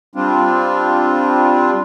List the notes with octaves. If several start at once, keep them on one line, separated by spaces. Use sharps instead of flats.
G3 C4 D4 F4